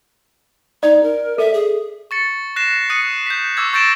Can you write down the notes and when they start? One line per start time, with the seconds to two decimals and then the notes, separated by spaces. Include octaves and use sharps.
0.83 D#4 D5
1.03 A#4
1.38 A4 E5
1.54 G#4
2.11 C#6 A6 C#7
2.56 F#6 A#6 C7 E7
2.90 D#6 F#6 C#7 D#7
3.27 G6 B6
3.57 C#6 D6 E6 G#6
3.73 C#6 G6 A6 A#6 D7 E7